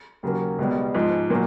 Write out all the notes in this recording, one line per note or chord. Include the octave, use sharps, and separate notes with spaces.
D#2 C#3 F#3 A#3
C#2 B2 G3
G#2 F3 G#3
A#2 F#3 A#3